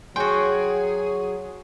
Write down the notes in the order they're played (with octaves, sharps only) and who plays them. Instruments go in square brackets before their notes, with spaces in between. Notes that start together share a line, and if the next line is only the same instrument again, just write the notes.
[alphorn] F#3 [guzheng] F#4 G5 [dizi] G#4 [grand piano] C#5 G#5 C6